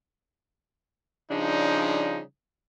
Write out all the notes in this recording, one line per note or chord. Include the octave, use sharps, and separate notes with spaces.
C#3 F3 G3 D4 D#4